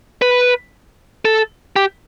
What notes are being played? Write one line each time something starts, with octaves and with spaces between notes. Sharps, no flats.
B4
A4
G4